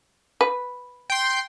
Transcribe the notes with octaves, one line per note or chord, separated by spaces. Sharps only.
B4
G5 C6